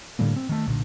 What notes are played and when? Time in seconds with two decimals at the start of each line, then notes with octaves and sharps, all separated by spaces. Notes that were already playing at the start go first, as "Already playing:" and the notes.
0.19 A2 D3 G3 A#3
0.36 C4
0.49 D#3 A3
0.67 B1 A#2 D3